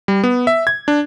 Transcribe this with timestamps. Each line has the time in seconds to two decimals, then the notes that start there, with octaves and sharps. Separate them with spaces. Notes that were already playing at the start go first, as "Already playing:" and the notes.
0.08 G3
0.24 B3
0.47 E5
0.67 G#6
0.88 D4